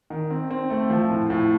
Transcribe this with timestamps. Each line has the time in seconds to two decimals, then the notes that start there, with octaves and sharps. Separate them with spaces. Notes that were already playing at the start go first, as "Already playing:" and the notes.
0.10 D#3
0.31 C4
0.51 C4
0.70 A3
0.90 F3
1.10 A2
1.30 A2